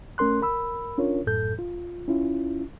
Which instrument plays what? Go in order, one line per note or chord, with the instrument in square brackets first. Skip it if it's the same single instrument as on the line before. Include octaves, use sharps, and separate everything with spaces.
[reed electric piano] A3 C#4 A#4 C6 F#6
A#4 B5 E6
C#4 D4 F4 A#4 C#5
F#2 A2 A4 G6
F4
C#4 E4 F4